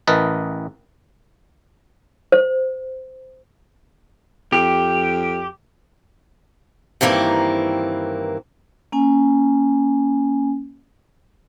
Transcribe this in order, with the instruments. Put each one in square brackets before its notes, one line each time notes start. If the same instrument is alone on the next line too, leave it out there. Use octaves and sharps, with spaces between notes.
[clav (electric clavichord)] A1 E3 A#4 B4 D#5 A5
[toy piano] C5
[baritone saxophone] F2 [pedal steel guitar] G4
[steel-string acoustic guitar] G2 D#3 E3 A#3 C4
[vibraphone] A#3 C#4 G#5